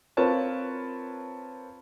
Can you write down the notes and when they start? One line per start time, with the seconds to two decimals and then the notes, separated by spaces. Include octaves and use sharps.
0.17 C4 F4 A#4 B4 C#5 A5